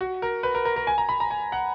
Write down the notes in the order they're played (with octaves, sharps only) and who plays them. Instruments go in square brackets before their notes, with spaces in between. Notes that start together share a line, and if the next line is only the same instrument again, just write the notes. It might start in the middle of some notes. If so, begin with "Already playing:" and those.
[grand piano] F#4
A#4
B4
A#4
A#4
A#4
G#5
A#5
B5
A#5
G#5
F#5